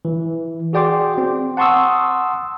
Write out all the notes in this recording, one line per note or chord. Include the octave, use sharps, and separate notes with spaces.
E3
F#4 G#4 D5 G5 C6 D6
C4
F#5 A5 C6 C#6 D#6 E6